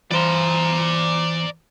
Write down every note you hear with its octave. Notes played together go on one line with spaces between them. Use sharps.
E3 C5 D5 A#5